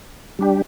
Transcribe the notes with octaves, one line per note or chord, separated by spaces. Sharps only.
G3 D4 G4